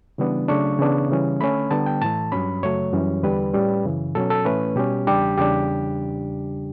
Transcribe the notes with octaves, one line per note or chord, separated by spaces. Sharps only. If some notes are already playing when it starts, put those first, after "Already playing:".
C#3 E3 G3 B3 D4
C#3 F#3 A3 D4 C#6
C#3 E3 B3 D4
C#3 E3 G3 C#4
D3 A3 C#4 B5
D3 G3 B3 A5
G5
A2 E3 A3 A5
G2 F#3 C#4 B5
F#2 C#3 F#3 A3 C#5
F#2 E3 G3 C#4
E2 D3 G3 B4
A2 G3 C#4
F#2 C#3 E3
B2 F#3 C#4 A4
A4
A2 E3 A3 C#4 B4
B2 G3 C#4 G4
E2 C#3 G3 D4 G4
E2 C#3 G3 D4 G4